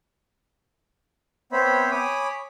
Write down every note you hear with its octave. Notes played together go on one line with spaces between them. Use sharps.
B3 C4 C5 C#5 E5 B5
C#5 G#5 B5 D6 D#6